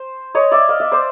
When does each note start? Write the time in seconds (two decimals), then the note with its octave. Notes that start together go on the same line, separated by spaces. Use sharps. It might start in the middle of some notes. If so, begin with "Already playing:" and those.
Already playing: C5
0.35 C#5 D#5
0.51 D5 E5
0.69 D#5 F5
0.80 D5 E5
0.92 C5 D5